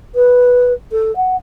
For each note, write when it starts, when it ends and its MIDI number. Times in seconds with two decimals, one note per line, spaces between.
0.15 0.72 71
0.91 1.14 69
1.16 1.35 78